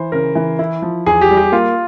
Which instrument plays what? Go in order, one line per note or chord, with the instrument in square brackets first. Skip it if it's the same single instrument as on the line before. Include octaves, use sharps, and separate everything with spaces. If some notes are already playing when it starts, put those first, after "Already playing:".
Already playing: [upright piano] E3 [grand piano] C5
[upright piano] C#3 [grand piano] A#4
[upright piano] E3
E4
F3
[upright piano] E2 [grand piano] G#4
[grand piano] G4
[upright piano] G3
[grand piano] G4
[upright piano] A#3 [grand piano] F4